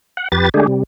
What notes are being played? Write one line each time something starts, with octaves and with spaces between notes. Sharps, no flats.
F#5
F2 G4 B4 A6
D3 G#3 A3 D4 G4 G#4
C3 G3